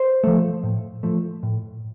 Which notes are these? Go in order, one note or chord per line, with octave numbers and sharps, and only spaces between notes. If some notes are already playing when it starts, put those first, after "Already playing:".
Already playing: C5
F3 A3
A2
F3 A3
A2